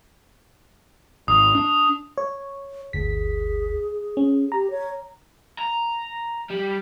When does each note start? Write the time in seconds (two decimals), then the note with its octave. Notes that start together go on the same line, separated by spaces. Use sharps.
1.28 G#1 D#6
1.55 D4
2.18 C#5
2.93 G1 D2 G#4 B6
4.17 C#4
4.52 G4 A#5
4.71 C#5
5.59 A#5
6.50 G3